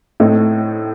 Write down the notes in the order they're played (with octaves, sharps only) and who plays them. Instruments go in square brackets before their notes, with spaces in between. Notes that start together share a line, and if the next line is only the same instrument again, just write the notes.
[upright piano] A2 A3 C4 D#4